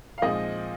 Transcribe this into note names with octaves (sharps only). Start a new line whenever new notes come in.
F5
A#2 F3 G#3 C4 D#4 D#5